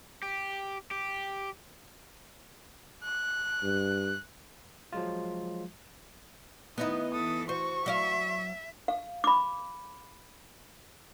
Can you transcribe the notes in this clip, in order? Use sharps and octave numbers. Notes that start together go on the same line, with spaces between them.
G4
G4
F#6
G2
F3 F#3 G#3 F4
D#3 B3 D#4 E4 D#5
E3 A4 D#6
F#4 C5 C#6
F#3 D5 E5 F5
F5
B5 D6